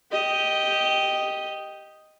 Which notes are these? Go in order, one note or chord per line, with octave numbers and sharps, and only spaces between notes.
G4 D#5